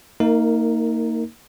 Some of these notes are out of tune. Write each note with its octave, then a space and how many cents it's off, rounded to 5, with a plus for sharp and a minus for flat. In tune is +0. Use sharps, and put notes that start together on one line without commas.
A#3 -25 D#4 +25 A#4 -5